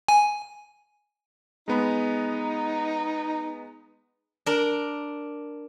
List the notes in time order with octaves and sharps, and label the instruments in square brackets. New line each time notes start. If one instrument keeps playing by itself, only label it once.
[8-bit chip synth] G#5
[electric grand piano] G#3 B3 B5 [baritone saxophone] D#4
[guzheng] D4 A#4